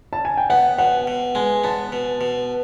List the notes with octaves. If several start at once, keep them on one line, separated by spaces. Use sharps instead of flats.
A5
G#5
G5
B3 F#5
B2 F#5
B2
G#3 G#5
B3 A5
B2
B2